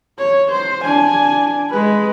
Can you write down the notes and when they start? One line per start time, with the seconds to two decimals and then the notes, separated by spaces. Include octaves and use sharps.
0.19 C#5
0.52 C5
0.84 D4 G#5
1.70 G#3 B4